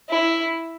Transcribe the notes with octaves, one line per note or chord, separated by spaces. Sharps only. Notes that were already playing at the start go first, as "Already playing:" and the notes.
E4